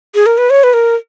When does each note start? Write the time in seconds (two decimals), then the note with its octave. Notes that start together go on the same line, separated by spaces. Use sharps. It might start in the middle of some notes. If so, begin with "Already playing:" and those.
0.15 G#4
0.26 A#4
0.38 B4
0.50 C#5
0.64 B4
0.74 A#4